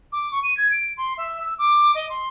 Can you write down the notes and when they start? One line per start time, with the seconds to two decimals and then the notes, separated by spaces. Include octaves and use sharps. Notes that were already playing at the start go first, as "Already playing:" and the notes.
0.12 D6
0.32 C#6
0.43 D#7
0.57 G#6
0.71 D7
0.97 C6
1.18 E5
1.41 E6
1.59 D6
1.95 D#5
2.09 C6